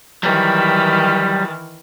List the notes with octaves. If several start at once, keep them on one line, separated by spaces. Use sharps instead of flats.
D#3 E3 F#3 G3